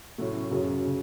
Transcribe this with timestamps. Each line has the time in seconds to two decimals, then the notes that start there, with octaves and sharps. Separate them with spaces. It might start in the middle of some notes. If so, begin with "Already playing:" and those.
0.18 A2 F#3 A3 C#4
0.51 F#2 C#3 F#3 C#4 G#4
0.86 C#3